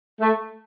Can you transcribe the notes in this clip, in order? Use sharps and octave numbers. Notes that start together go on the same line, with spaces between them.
A3